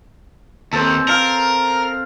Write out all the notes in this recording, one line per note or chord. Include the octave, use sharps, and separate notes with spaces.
D#2 C4 A4
A#4 F5 A5